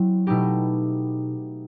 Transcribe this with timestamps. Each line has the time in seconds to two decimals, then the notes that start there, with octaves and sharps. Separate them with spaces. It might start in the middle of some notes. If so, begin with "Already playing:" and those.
Already playing: F#3 C4 E4
0.27 B2 A3 D#4 G4